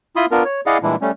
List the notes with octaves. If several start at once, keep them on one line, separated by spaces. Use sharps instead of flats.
E4 F4 B5 C6 D#6
B3 D4 F4 A#4
C#5
E4 G#4 D5 D#5 F5 F#5
A#2 E3 G3 G#3 D4 E4
G3 A3 C#4